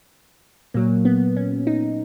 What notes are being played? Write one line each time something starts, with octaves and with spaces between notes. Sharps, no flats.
A#2 F#3 A#3
B3
C#4
D#4